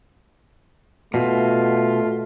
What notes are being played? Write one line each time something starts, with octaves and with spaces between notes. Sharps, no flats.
B2 A3 F4